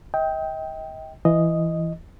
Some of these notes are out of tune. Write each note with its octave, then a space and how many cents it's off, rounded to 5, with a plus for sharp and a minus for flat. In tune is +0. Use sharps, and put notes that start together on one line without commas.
D#5 +40 G5 +0
E3 +15 D#5 +0